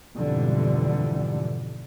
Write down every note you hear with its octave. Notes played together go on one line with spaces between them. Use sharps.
F2 G#2 B2 D3 E3 G3